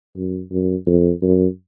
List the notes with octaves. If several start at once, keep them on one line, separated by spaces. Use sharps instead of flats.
F#2
F#2
F2
F#2